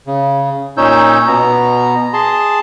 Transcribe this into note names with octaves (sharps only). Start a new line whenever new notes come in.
C#3
A#2 C#4 D#4 C#5 E6 G6
B2 B3 A#5
G#4 A5 C6